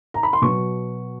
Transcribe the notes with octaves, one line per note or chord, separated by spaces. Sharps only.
A#5
B5
C6
B2 F#3 B3 C#6